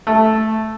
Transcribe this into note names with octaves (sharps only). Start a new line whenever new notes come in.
A3